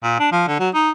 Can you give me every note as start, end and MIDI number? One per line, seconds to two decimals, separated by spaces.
0.03 0.19 46
0.20 0.31 62
0.32 0.45 53
0.48 0.59 50
0.59 0.70 54
0.75 0.90 63